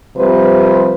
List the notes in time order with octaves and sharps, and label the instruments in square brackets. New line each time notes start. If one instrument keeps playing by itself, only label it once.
[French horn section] C3 F3 G3 B4 C5